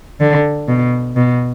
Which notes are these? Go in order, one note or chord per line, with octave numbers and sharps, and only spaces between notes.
D3
B2
B2